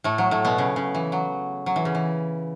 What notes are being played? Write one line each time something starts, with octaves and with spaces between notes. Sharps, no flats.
A2 A3
F#3
A2 A3
B2 B3
C#3
C#3
E3
F#3
F#3
E3
C#3
E3